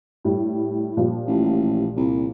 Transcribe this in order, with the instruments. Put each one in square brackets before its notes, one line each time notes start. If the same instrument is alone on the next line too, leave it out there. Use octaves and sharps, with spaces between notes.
[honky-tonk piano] A2 G3
A#2 F3 G3
[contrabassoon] A1
C2